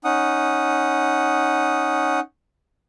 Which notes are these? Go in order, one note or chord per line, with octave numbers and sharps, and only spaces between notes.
C#4 D#4 F#5 D#6